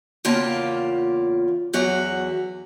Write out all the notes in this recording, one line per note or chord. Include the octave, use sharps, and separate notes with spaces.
E2 C#3 A#3 F4 G5 A5
E2 F#3 F#4 E5